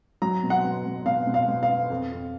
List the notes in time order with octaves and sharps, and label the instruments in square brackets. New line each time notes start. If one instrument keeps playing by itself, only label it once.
[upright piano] F#3 A#5
B2
F#5
B2
B2
B2 F5
B2
F5
B2
F5
B3
F2
F2